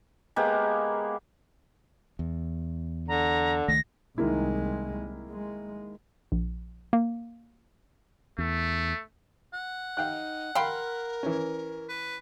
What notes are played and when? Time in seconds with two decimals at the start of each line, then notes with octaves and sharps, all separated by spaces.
0.36 G#3 A#3 B3 G4
2.19 E2
3.08 D3 A#5
3.68 C#2 D#3 A3 A#6
4.18 C2 D#3 G#3 A#3 E4
5.30 G#3
6.32 A#1
6.93 A#3
8.39 E2 A3
9.54 F#5
9.97 D#4 F5 G5 F#6
10.55 A#4 F5 G5 B5 C6
11.23 E3 C#4
11.89 B4